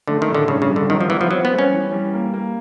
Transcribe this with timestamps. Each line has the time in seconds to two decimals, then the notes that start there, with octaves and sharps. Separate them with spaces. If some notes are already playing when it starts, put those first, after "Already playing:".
0.08 D3 A3
0.22 D#3
0.28 A2
0.35 D3
0.48 G2 C#3
0.62 C#3
0.70 G3
0.76 D3
0.90 D#3 F#3
1.01 F3
1.10 E3 B3
1.21 F3
1.31 F#3 C4
1.45 B3
1.52 G3
1.59 C#4
1.73 E3
1.92 G3
2.14 A#3
2.34 A#3